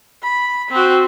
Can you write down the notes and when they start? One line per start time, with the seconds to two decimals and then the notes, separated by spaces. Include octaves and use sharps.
0.23 B5
0.71 C4 F#4